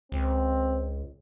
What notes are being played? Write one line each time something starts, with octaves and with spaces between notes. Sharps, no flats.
C#2 C4